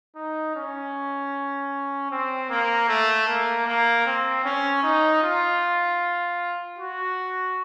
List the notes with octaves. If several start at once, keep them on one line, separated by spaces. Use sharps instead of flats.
D#4
C#4
C4
A#3
A3
A#3
A#3
C4
C#4
D#4
F4
F#4